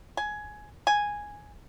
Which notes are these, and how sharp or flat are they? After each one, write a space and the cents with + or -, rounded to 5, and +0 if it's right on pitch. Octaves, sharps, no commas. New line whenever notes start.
G#5 +15
G#5 -5